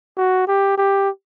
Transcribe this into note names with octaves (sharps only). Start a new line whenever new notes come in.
F#4
G4
G4